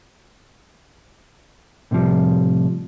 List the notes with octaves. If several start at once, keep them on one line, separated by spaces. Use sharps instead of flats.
A2 C3 D#3 F3 G3